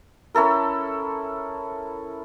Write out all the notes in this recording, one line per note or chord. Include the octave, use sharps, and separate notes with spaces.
C#4 E4 A4 A#4